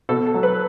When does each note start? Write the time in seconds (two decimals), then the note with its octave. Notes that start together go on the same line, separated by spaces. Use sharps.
0.09 B2 A4
0.26 A4
0.34 F#3
0.43 B4